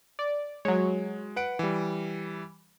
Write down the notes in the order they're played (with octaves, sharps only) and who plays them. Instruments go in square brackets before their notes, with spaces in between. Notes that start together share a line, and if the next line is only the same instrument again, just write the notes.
[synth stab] D5
[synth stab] F#3 C#5 [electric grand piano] G#3
[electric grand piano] B4 F#5 D7
E3 G3